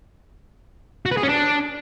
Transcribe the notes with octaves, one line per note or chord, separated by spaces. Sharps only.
F#4
B4
G#4
C#4
D4